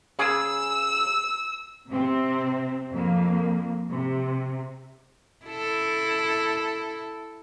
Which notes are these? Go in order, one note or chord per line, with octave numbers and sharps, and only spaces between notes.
C#3 G#4 E6
C3 C4
F2 A#3
C3
E4 A4